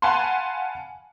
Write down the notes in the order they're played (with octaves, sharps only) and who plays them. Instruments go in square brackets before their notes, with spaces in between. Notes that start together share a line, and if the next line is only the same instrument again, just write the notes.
[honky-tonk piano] F5 F#5 G#5 A5 B5 C6